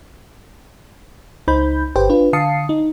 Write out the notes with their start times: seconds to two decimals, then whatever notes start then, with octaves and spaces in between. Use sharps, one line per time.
1.48 C#2 D#4 C5 B5 G6
1.96 G1 G4 B4 C5 G5
2.09 D4 F4 B4
2.33 D3 F5 A5 D#6 C7 C#7
2.69 D#4